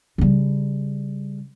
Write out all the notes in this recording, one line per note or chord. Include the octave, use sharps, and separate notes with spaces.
C#3 G3